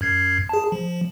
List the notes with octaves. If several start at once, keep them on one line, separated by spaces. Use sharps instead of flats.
F#2 G#6 C7
G#4 A5
F3